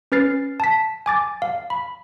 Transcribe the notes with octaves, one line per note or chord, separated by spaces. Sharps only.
C#4 B4 F6 A6 C7
A5 B6
G#5 D6 A6
F5
B5